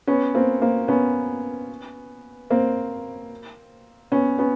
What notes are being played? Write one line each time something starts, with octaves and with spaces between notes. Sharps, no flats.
B3 C#4
A#3 C4
A#3 C4
B3 C#4
A#3 C4
B3 C#4
B3 C#4